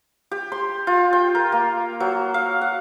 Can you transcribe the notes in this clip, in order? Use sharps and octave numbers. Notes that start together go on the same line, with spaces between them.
G4
C6
F4
G5
A#4
A#3
F#3
F5
F#5